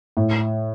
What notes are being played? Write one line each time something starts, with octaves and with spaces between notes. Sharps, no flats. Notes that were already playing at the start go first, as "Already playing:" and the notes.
A2